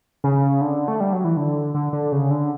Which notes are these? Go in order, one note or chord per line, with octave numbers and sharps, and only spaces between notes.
C#3
D3
A3
G3
F#3
E3
D3
D3
D3
C#3
D3